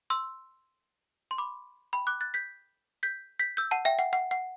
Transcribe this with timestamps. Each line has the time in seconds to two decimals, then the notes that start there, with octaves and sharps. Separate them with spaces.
0.10 C6 E6
1.31 C6
1.38 B5 D6
1.93 G5 B5
2.07 D6 F#6
2.21 F#6 A6
2.34 G6 B6
3.03 G6 B6
3.39 G6 B6
3.57 E6 G6
3.71 F#5 A5
3.85 E5 G5
3.99 F#5
4.13 F#5
4.31 F#5